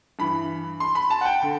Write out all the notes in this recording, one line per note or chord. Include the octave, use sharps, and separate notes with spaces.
G2 E3 B5
C6
B5
A5
F#5
G5
D3